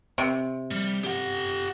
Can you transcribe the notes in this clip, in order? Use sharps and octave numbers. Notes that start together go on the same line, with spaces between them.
C3
G3
G4 F#5